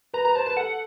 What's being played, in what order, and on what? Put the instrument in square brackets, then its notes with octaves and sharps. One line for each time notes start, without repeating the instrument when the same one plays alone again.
[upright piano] B4 [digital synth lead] A#5
[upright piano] B4 [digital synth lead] A#5
[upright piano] C5 [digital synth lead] A5
[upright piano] B4 [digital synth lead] A5
[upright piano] A4 [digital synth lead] F#5